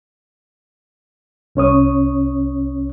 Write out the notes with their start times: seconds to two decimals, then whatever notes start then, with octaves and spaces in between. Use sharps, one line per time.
1.55 C2 C#4 C#5 D#6